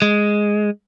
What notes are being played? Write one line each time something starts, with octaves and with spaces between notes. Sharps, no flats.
G#3